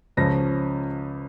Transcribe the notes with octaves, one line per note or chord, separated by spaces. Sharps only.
C#2 C#3 F3 C#4 A#6